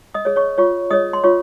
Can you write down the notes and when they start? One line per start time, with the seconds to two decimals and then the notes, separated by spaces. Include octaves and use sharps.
0.14 D#5 D#6
0.25 G#4 C#5
0.36 C#5 C#6
0.58 F4 C#5 C#6
0.91 G#4 C#5 D#5 D#6
1.13 C6
1.24 F4 C#5 C#6